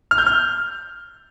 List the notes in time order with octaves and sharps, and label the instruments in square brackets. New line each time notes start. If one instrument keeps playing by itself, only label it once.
[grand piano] F6
G6
F6